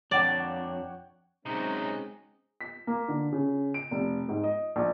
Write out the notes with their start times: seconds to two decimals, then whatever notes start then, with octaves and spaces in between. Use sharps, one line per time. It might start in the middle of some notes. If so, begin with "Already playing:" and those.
0.11 F2 D4 C#5 D5 F#5 G5
1.46 C3 F#3 G#3 C4 C#4 D#4
2.61 B6
2.87 A#3
3.08 D3
3.33 C#3
3.74 D7
3.91 F1
4.29 G#2
4.44 D#5
4.76 A#1